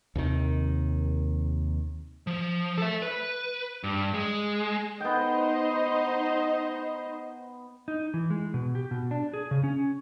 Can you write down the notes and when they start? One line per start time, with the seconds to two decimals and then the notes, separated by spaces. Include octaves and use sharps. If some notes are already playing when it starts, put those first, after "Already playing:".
0.15 D#2 C3 D#3
2.27 F3
2.78 A4 E5
3.02 B4
3.84 G2
4.14 G#3
5.00 B3 D#4 C5 D#5 G5
7.88 D#4
8.14 E3
8.30 G#3
8.54 B2
8.75 G4
8.91 B2
9.11 D4
9.34 G#4
9.51 C#3
9.64 C#4